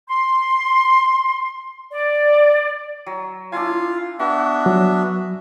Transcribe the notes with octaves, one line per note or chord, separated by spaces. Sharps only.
C6
D5
F#3
D4 E4 F4 F5 G#5
B3 D4 F#4 E5
F#3